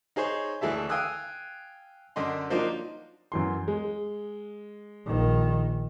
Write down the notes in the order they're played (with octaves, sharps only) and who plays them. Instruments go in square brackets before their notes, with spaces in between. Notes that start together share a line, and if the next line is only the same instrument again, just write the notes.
[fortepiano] D#4 G#4 C5 C#5
D2 E3 G#4 A4 E5
F5 G5 G#5 D#6 E6 F#6
F#2 D3 D#5 C6
F3 F#3 A#3 D4 D#4 C5
[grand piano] F#2 E3 C6
G#3
[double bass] A#1 D#3